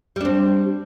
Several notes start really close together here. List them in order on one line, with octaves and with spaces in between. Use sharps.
G3 D4 C4